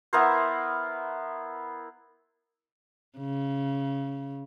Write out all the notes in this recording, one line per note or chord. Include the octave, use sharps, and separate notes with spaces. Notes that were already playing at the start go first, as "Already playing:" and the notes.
B3 E4 A#4 C5
C#3